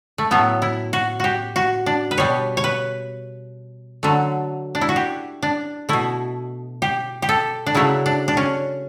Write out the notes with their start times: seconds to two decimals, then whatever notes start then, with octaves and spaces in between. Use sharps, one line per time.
0.18 A3
0.31 A2 F#3 A3 B3
0.62 E4
0.93 F#4
1.20 F#4 G4
1.56 F#4
1.86 D4
2.11 B4
2.18 B2 G3 C#5
2.57 C#5
2.64 B4
4.03 D3 F#3 A3
4.75 D4
4.81 E4
4.89 F#4
4.96 G4
5.42 D4
5.89 B2 A3 E4
6.82 G4
7.22 G4
7.29 A4
7.66 D4
7.75 C#3 F#3 A3 E4
8.06 D4
8.28 D4
8.37 C#4